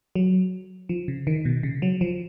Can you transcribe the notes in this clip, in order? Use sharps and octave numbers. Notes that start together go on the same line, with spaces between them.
F#3
F3
C#3
D#3
B2
C#3
F#3
F3